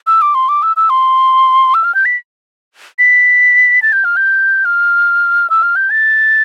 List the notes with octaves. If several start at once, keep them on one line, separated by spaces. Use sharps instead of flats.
E6
D6
C6
D6
E6
E6
C6
E6
F6
G6
B6
B6
A6
G6
F6
G6
F6
E6
F6
G6
A6